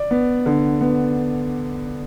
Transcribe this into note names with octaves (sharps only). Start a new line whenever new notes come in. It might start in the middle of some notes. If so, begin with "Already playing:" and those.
Already playing: D5
B3
D3
B3